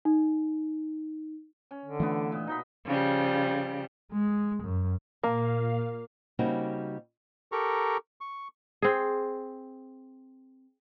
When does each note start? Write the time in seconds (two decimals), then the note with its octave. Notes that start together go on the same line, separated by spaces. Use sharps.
0.05 D#4
1.71 C#4
1.85 D3
2.00 E3 A3 B3 D4 F4 E5
2.32 A#2 D#5
2.47 B2 D#4 D#5 B5
2.84 C#3 F3 G3
4.13 G#3
4.63 F#2
5.24 A#2 A#3 F5
6.39 C#3 G3 A#3 C4 D#4 F#4
7.52 G4 A4 A#4 A#5 C#6
8.21 C#6
8.82 C4 G#4